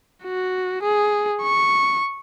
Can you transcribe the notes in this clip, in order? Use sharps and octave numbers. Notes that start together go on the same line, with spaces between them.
F#4
G#4
C#6